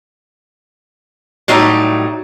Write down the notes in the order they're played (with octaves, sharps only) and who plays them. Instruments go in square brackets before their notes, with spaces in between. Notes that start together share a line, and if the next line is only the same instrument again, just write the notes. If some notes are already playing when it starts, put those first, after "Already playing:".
[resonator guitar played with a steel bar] A2 F#3 G3 D#4